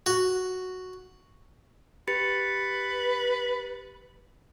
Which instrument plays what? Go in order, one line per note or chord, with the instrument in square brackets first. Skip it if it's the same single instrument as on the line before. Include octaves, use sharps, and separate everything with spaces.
[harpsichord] F#4
[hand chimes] G4 A6 C#7 [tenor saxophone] B4